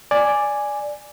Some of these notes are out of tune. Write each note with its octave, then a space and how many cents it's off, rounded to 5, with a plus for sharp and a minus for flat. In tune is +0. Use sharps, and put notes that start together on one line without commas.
D5 +0 G#5 +0